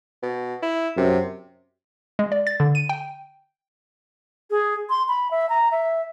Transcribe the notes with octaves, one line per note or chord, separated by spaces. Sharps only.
B2
E4
F#2 C3
G#3
D5
A6
D3
D#7
G5
G#4
C6
B5
E5
A#5
E5